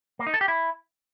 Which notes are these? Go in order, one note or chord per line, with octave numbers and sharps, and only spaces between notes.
A#3
D#4
A4
G4
E4